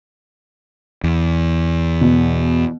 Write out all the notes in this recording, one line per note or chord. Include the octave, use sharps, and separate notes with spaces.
E2
B2